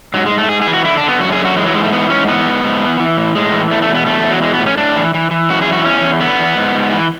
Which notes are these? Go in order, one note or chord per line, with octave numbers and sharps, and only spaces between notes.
G#2 F#3
G#3
G#2
A3
G#2 G#4
G#4
E3
F#4
D3 E4
D4
D3 B3
F#2 F#4
G#4
D3
F#4
E3 G#3
F#3
G#2 G#3
A3
E3 B3
G#2 C#4
E3 B3
G#2
G#2
E3
E3
A2
A2 G#3
E3
E2 A3
A3
B2
B3
E2 A3
B2
F#3
E3 G#3
B3
A2
C#4
A2 D4
E3
E3
E3
F#2 F#4
G#4
E3
F#4
E2 C#4
E2
D3 B3
E2
G#2
G#2
E3